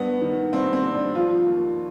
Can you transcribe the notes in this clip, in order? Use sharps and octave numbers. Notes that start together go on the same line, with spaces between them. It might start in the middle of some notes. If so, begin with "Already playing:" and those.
Already playing: G2 B3
D#3
G2 C4
C4
G2
D4
F3 F4
D#2